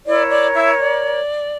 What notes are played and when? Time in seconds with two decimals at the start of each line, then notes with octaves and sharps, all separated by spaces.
0.06 E4 A#4 C#5 D5
0.30 D5
0.54 E4 E5
0.77 D5